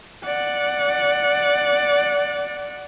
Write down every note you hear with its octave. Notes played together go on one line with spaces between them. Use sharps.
D5 F#5